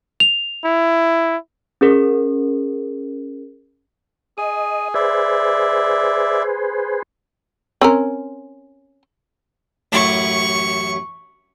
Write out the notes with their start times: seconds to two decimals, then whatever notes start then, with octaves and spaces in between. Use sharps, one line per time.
0.20 F7
0.65 E4
1.81 C#4 G#4 A#4
4.38 G#4 D#5
4.94 G#4 B4 C5 D5 E5
7.81 C4 C#4 A#4
9.92 A1 F#2 E4 C#6